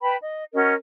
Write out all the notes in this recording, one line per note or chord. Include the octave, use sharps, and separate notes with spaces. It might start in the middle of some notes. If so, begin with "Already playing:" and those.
B4 G5 A5 B5
D#5
C#4 F#4 A#4 D#5